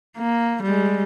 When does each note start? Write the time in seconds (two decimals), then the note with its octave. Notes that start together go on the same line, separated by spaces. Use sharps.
0.18 A#3
0.63 G3 G#3